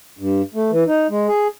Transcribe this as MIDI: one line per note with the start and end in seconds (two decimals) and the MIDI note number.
0.19 0.42 43
0.54 0.71 57
0.71 0.84 52
0.87 1.07 63
1.09 1.27 56
1.28 1.47 68